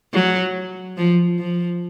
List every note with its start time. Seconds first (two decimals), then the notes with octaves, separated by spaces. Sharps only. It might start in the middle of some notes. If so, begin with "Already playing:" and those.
0.13 F#3
0.97 F3
1.39 F3